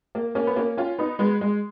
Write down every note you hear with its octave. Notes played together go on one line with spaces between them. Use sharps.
A#3
A#3 C#4
B3
A#3 C#4
C#4 F4
B3 D#4
G#3 B3
G#3